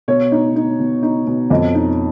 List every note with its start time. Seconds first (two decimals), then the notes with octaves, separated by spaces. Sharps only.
0.08 B2 C#5
0.32 D#4
0.56 D#4
0.80 B2
1.03 D#4
1.27 B2
1.50 F2 D#5
1.75 D#4